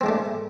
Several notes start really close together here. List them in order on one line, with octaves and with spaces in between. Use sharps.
C4 G#3 D4 A3